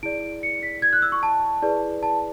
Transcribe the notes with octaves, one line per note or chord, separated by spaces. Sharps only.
E4 G#4 D5 D7
C#7
B6
G#6
F#6
E6
C#6
A5
E4 G#4 B4 D5
A5